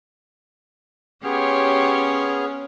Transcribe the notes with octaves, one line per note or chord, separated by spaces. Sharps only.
B3 C#4 G4 G#4 C#5 C6 F6